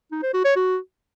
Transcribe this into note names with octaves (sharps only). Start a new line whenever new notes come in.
D#4
C5
F#4
C#5
F#4